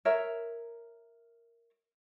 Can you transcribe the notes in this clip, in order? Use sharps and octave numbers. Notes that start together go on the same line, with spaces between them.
A#4 C#5 E5 A#5